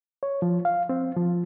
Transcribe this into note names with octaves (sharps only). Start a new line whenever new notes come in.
C#5
F3
F5
C4
F3